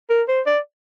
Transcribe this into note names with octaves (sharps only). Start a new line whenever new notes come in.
A#4
C5
D5